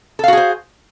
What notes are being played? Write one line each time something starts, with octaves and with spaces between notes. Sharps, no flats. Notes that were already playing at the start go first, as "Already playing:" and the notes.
F#4 G#4 A4 C5 F5